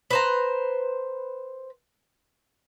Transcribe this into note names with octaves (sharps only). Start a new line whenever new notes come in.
B4 C5 A#5